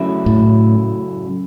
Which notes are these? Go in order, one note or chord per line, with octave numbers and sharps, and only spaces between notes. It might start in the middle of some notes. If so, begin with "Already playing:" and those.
Already playing: F#2 C#3 F#3 A3 E4
A2